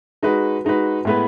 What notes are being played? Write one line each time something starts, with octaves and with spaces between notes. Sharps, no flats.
G#3 D#4 F#4 B4
G#3 D#4 F#4 B4
A2 G#3 B3 E4 B4